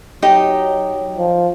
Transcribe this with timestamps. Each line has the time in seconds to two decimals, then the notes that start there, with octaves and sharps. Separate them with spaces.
0.22 F#3 D#4 G4 D#5
1.18 F3